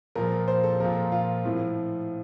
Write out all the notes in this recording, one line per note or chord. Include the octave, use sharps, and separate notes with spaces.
A#2 F3 A#4
C5
A4
A#2 F3 A#4
F4
A2 F3